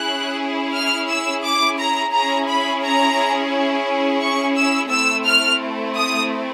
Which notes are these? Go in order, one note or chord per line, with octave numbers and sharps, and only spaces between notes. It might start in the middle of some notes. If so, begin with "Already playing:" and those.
Already playing: C#4 E4 G#4 F#6
F6
E6
D6
A#5
C#4 E4 G#4 A#5
B5
A#5
C#6
E6
A3 C4 E4 E6
F6
D#6